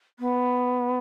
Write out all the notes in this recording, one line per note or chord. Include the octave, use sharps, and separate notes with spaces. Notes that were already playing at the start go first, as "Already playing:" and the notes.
B3